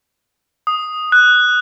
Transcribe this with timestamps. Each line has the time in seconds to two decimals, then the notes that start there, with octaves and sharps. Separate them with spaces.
0.67 D#6
1.12 F#6